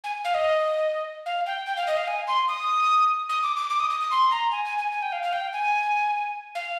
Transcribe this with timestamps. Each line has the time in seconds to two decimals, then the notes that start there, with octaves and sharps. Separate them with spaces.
0.04 G#5
0.25 F5
0.34 D#5
1.26 F5
1.46 G5
1.66 G5
1.77 F5
1.87 D#5
1.97 F5
2.07 G#5
2.27 C6
2.48 D#6
3.29 D#6
3.43 D6
3.56 D6
3.70 D6
3.80 D#6
3.90 D#6
4.00 D#6
4.11 C6
4.31 A#5
4.51 G#5
4.65 G#5
4.78 G#5
4.92 G#5
5.02 G5
5.12 F5
5.23 F5
5.33 G5
5.53 G#5
6.55 F5